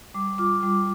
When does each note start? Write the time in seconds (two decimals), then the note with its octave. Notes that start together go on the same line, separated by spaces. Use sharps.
0.14 G3 D6
0.38 F4 D6
0.63 G3